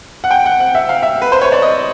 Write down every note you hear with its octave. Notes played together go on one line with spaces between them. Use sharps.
F#5
G5
F#5
F#5
E5
F5
E5
B4
C5
C#5
D5
D#5